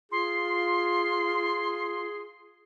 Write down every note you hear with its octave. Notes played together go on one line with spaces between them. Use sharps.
F4 G#4 C6